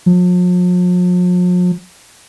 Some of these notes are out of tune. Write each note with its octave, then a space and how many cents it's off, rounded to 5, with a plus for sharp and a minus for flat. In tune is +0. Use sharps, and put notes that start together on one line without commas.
F3 +45